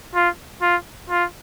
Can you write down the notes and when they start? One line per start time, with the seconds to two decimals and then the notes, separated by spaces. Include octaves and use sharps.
0.15 F4
0.62 F4
1.10 F4